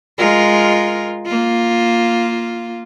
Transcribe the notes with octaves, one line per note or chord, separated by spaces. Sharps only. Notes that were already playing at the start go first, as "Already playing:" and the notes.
G#3 F4 A#4
A#3 F4